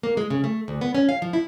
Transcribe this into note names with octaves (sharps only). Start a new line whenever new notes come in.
A#3
G#3
C#3
A3
D2
B3
C#4
F5
F3
E4